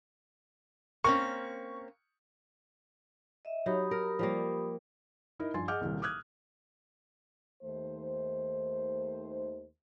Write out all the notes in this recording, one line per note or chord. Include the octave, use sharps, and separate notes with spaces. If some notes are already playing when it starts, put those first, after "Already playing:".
A#3 C4 C#4 C#6
D#5 E5
F#3 D#4 G4 B5 D#6
A#4
F3 G3 A#3
D#4 E4 A#4 D#5
G2 F3 G#5 C6 A6
G#4 D#5 F#5 D6 F6 G6
D#1 C2
D6 D#6 F6 F#6 G#6
D#2 D#3 A3 C5